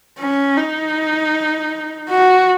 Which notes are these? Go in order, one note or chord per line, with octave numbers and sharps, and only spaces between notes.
C#4
D#4
F#4